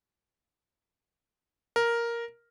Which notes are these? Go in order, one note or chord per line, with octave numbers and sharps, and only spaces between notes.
A#4